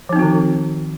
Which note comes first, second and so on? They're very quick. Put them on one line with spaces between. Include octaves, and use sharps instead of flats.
F3 D#4 C4 F#4 D#3